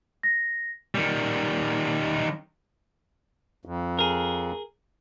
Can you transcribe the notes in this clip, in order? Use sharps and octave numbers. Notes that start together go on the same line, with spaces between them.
A#6
D#3 G3
F2
G#4 A#4